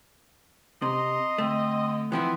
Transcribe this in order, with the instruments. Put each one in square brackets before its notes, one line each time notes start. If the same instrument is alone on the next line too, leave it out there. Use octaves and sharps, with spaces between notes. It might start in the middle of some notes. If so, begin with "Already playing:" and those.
[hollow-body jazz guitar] C3 [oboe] D#5 [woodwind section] A#5 C6
[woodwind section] D3 [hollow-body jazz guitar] A3 [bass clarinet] C4
[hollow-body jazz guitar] E3 F3 E4 [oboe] B3 [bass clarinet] C4